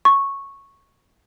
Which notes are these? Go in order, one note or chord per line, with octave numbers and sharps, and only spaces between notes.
C#6